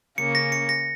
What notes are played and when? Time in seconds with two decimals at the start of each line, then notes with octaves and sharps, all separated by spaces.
0.18 C#3 A#3 C#4 C#7
0.35 A#6
0.52 C#7
0.69 A#6